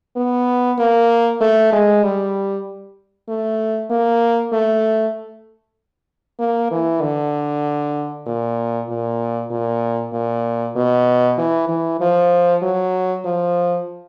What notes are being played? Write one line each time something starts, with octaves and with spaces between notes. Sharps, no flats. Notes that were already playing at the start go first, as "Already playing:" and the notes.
B3
A#3
A3
G#3
G3
A3
A#3
A3
A#3
E3
D3
A#2
A#2
A#2
A#2
B2
E3
E3
F3
F#3
F3